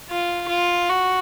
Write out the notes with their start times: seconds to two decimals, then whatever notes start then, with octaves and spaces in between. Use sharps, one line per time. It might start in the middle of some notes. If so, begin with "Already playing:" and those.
0.10 F4
0.49 F4
0.89 F#4